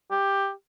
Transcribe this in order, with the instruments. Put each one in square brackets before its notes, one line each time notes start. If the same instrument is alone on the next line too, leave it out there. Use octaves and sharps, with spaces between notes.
[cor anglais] G4